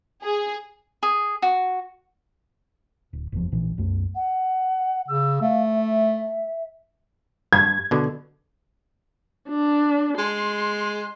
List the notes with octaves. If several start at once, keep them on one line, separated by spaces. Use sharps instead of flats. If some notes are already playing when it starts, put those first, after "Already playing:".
G#4
G#4
F#4
D1
F#1 E2 F3
A#1 A#2 E3
C2 F#2 A3
F#5
C#3 E6
A3 F5
E5
G2 G#6
B2 D3
D4
G#3 C6